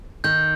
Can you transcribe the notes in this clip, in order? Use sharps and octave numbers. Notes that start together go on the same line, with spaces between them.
D#3 G6